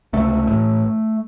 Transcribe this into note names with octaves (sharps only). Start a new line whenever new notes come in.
C#2 C3 A3
A1 A2